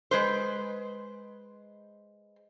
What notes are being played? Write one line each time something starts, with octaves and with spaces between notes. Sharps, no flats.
G#3 B4 C5